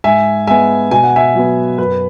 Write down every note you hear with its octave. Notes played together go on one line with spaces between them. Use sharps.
G#2 E5 G#5
G#3 B3 E5 G#5
B2 G#5
F#5
E5 G#5
F#3 B3
F#2 B4